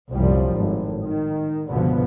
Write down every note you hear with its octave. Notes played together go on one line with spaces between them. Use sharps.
C2 F#2 A#2 F3 G3
G#1 A2
D#3
C#2 G2 B2 D3 F3 B3